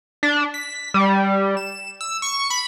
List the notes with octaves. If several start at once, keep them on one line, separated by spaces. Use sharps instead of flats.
D4
B6
G3
E7
E6
C#6
B5